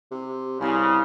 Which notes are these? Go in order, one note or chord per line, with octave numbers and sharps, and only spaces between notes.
C3
C2 C#3